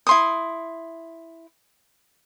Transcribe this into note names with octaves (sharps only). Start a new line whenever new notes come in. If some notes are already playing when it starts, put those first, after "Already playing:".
E4 C6 D#6